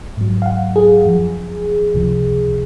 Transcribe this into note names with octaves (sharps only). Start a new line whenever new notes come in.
G#2 F#3
F5
F#5
G#4
F#2 F3
C#2 C3 F3